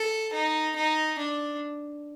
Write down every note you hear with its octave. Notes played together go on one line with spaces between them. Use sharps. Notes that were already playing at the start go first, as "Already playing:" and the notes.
Already playing: A4
D#4
D#4
D4